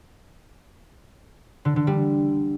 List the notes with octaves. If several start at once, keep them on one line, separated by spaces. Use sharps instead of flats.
D3
D3
G3